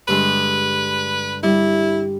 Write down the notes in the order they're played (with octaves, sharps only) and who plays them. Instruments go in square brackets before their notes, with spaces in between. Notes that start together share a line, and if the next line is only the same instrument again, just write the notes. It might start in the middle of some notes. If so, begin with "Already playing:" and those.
[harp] G2 D3 G#3 [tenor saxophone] B4
[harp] G3 [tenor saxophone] E4